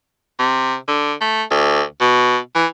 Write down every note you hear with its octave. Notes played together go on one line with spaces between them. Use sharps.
C3
D3
A3
D2
B2
E3